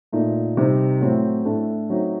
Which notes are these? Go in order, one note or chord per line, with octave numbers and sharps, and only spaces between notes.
A#2 A3 D#4
C3 G3 C4 D#4
A2 F#3 C4
A2 A3 D4
F#3 A3 C4 D#4